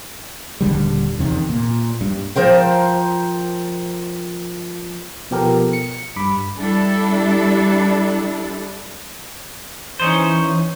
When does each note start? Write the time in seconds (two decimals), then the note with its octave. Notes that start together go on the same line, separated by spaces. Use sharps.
0.61 D#1 A#1 D3 G3
1.19 E2 C3 D#3
1.49 A#2
2.01 G2
2.36 F3 A#4 C5 G5
5.31 B2 F3 B3 G4 A4 A#4
5.73 C#7
6.16 G2 B5 D6
6.59 G3 D4 E4 A4
10.00 E3 C#4 D#4 C5